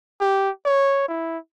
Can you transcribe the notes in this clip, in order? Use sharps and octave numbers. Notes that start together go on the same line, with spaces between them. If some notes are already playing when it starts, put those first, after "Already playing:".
G4
C#5
E4